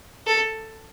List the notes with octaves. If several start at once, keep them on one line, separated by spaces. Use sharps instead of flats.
A4